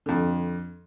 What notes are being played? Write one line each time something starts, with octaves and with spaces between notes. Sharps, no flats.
F2 D3